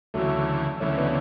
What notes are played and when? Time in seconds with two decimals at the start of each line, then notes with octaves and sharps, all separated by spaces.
0.14 D2 C#3 E3 F#3 A3
0.80 D2 C#3 E3 A3 C#4
0.98 B3 D4